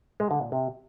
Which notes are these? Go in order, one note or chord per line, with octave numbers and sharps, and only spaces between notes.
G#3
D3
A#2
C3